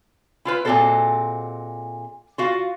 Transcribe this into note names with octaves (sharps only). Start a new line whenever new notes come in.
E4 F4 B4
A#2 G#3 C4 F#4 A4 C5
F4 F#4 F5